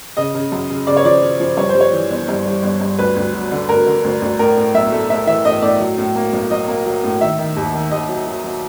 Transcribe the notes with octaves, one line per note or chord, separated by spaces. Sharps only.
C#3 D#5
C#3
F#2
C#3
C#3 D5
C#5
F3 D5
F3
F3
G2 C#5
C5
G3
C#5
E3
G1
G2
G3
G1
G2
D2 B4
D2
F#3
D3
D2 A#4
D3
D2
D2
A2 A#4
A2
B1 E5
A3
A3 E5
E3 E5
A2 D#5
A2 D5
F#3
A2
A#3
B1
F#3 D#5
A#3
F#3
A2
D#3 E5
D#3
D#2
D#3
D#2 D#5
F#3
F#3
F#3